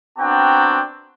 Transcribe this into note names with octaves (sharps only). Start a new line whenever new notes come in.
B3 C4 D4 F#4 G5 A#5